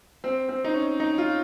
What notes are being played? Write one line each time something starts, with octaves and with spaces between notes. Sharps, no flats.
C4
C4
D#4
C#4
D#4
F4